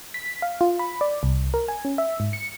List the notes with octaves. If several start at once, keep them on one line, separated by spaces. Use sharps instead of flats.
B6
F5
F4
B5
D5
C2
A#4
G#5
C#4
E5
G#2
C#7